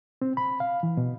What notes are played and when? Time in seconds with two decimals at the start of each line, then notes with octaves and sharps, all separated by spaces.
0.22 C4
0.37 B5
0.60 F5
0.83 E3
0.97 B2